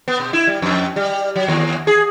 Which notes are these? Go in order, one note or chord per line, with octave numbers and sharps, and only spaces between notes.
B3
B2
E4
G3
F2
G3
F#3
D#2
G#4